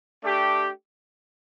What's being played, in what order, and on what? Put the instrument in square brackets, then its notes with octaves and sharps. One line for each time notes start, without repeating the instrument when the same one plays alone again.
[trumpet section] A3 D4 G4